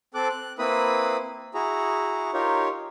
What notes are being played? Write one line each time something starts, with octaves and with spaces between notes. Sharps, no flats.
C4 A4 D6 F#6
F#6
A#3 C4 E4 B4 B5 D#6
E4 F#4 G#4 A#5
D#4 F4 G4 A#4 C#5